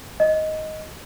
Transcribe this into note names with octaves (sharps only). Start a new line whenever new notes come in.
D#5